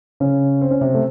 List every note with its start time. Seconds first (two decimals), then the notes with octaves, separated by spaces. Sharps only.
0.20 C#3 C#4
0.61 C4
0.71 C#4
0.81 C3 C4
0.94 A3